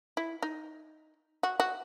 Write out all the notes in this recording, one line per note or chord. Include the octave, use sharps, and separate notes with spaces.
E4
D#4
F#4
F#4